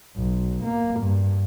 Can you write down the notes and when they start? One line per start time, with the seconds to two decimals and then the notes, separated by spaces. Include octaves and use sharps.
0.16 B1
0.64 A#3
1.00 G2